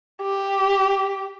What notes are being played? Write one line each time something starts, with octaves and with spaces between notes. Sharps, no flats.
G4